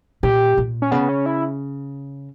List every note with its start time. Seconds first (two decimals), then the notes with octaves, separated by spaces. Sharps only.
0.23 A#2 G4
0.58 A#2
0.82 C#4
0.91 C#3 B3
1.09 C#4
1.26 E4